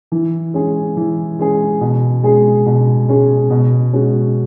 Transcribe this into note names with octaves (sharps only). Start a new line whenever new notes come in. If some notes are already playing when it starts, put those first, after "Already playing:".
E3
G#3 C#4 G#4
E3
G#3 C#4 G#4
B2
G#3 C#4 G#4
B2
G#3 C#4 G#4
B2
G#3 C#4 F#4